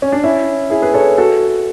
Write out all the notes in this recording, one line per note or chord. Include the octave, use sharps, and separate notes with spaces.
C#4
D4
C#4 E4
E4 G#4
G#4 B4
A4 C#5
F#4 A4